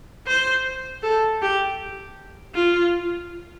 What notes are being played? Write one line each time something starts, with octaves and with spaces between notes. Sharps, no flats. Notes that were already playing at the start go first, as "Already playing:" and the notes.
C5
A4
G4
F4